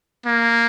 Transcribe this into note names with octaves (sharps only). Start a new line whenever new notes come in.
A#3